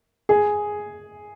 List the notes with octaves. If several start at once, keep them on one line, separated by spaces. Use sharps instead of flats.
G#4